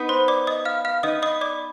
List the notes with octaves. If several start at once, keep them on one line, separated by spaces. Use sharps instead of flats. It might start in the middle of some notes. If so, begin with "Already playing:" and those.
Already playing: B3 D#4 B4
C5 C6
D5 D6
D#5 D#6
F5 F6
F5 F6
B3 D#4 B4 D#5 D#6
D#5 D#6
D5 D6